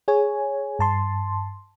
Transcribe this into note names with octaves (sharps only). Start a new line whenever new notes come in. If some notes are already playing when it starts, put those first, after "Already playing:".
G#4 C#5 G#5
G2 A5 C6